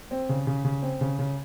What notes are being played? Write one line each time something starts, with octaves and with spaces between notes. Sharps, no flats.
C4
C#3
C#3
C#3
C4
C#3
C#3